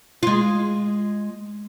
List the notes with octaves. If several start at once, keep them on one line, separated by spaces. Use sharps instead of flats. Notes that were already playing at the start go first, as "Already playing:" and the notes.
G#3 F4